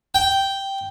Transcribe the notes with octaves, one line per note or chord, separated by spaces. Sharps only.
G5